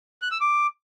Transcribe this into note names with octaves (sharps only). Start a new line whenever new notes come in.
F#6
E6
D6